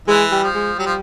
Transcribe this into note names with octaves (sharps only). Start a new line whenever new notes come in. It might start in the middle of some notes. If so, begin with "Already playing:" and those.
E3 G#3
G3
F3
G#3
F#3 G3
F3